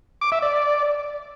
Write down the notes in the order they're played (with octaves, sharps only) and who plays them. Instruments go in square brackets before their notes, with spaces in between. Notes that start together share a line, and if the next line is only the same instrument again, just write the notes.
[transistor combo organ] D6
E5
D5